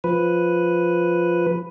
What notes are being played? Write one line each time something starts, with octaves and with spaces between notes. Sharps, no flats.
F3 B4